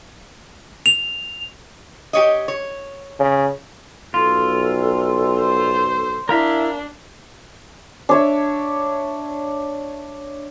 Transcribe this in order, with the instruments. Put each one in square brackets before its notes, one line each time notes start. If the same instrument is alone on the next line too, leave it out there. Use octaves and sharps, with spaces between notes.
[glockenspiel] F7
[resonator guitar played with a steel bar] G4 C#5 D#5
C#5
[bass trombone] C#3
[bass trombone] B1 [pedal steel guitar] F4 [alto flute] A4
[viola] C5
[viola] D4 [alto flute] E4 [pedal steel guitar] A#4 F5 B5
[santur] D4 C#5 E5